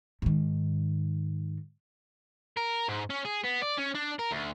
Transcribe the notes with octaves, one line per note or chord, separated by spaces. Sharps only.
G#2 D#3
A#4
G#2
C#4
G#4
B3
D5
C#4
D4
A#4
D2